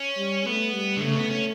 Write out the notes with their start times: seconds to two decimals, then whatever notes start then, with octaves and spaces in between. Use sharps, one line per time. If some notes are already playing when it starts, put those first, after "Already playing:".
Already playing: C#4
0.17 G3
0.46 A3 B3
0.74 G3
0.97 D3
1.02 C#3 A3
1.16 B3
1.30 C#4